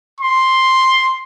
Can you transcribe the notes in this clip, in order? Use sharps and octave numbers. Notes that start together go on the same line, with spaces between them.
C6